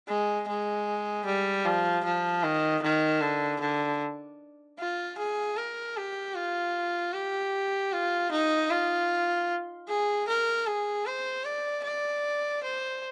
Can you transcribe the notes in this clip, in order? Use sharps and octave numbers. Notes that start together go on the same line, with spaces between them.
G#3
G#3
G3
F3
F3
D#3
D#3
D3
D3
F4
G#4
A#4
G4
F4
G4
F4
D#4
F4
G#4
A#4
G#4
C5
D5
D5
C5